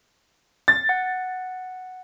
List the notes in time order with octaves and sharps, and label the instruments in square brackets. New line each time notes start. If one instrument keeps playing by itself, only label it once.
[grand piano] A6
[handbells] F#5